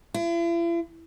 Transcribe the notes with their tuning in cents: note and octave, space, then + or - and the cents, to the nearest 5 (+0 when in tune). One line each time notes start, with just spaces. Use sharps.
E4 +45